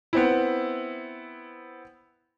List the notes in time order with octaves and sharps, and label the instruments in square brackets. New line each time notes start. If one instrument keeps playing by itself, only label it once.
[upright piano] B3 C4 E4